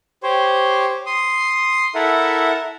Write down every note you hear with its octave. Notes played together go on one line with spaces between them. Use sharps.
G4 C5 C#5
C6 D#6
E4 A4 A#4 E5 F#5